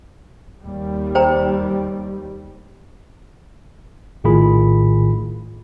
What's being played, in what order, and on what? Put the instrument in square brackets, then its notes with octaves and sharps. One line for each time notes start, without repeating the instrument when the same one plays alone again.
[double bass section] D#2 G3
[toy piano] C5 G5 A#5
[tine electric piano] A#1 A2 D#3 F4 G#4 B5